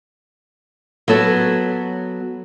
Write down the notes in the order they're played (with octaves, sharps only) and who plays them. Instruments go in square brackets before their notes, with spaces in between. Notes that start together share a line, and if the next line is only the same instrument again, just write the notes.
[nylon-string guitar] F#3 B3 A4 C#5